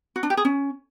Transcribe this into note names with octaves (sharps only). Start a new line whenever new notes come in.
F#4
D4
G4
G#4
C#4